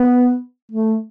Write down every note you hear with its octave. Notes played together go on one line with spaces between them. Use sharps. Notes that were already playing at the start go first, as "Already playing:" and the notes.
Already playing: B3
A3